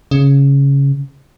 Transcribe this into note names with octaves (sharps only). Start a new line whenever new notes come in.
C#3